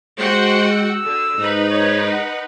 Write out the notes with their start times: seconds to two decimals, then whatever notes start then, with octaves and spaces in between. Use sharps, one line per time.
0.19 G#3 F#4 C5 F#5 G5
0.71 E6
1.05 D3
1.38 G#2 D#4 B4
1.70 C#5
2.13 F#5